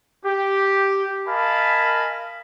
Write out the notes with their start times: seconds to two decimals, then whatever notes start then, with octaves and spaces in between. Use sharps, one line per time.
0.25 G4
1.27 A#4 D#5 F5 G#5 A5 B5